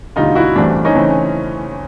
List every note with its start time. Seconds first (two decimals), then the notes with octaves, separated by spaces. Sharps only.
0.16 E1 D2 D3 G3 D#4 F4
0.35 E4 F#4
0.55 A1 G2 E3 A3 C4 D4
0.85 C#4 D#4
0.95 C#3 E3 A3 C4